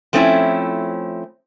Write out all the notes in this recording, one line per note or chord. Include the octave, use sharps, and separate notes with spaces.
F3 A3 C4 C#4 E4